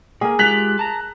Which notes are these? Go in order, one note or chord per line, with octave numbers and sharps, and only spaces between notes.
A#3 G#4 A#4
G#3 F4 G4 F#6 B6 F7
A5 A#5